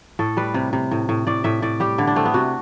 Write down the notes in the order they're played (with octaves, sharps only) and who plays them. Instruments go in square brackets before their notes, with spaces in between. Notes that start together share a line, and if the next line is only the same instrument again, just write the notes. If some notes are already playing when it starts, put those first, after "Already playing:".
[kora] A2 A4
G3 B4
C3
C3
A2
A2
A2 D5
A2 E5
A2 D5
G3 G4
D3 E4
D4
A3 C4
B3
C3 F#4